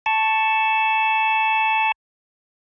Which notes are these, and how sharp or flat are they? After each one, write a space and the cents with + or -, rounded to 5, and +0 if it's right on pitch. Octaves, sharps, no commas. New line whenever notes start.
A5 +0 C#6 +0